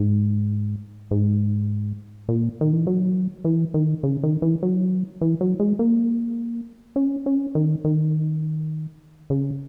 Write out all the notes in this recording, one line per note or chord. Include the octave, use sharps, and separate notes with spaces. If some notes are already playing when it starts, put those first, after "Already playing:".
Already playing: G#2
G#2
A#2
D#3
E3
F#3
E3
D#3
C#3
D#3
E3
F#3
E3
F#3
G#3
A#3
C#4
C#4
D#3
D#3
C#3